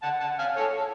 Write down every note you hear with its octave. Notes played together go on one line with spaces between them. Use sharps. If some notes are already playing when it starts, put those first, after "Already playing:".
F#5 A5
F#5 A5
F5 G#5
A4 C#5
A4